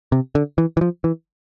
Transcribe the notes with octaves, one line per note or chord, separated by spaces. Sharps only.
C3
D3
E3
E3
F3
E3